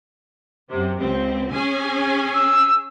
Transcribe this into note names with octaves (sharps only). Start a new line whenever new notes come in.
F#2 C3
C#2 C4
C#4 G#4 G#5
E6